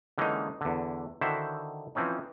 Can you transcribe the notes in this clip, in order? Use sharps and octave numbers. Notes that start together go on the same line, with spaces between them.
D3 E3 G#3 A#3 C#4 D#4
E2 D3
D3 D#3 E4 F#4 C5 E5
E3 F3 C4 C#4 D#4